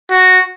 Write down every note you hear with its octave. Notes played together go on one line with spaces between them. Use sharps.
F#4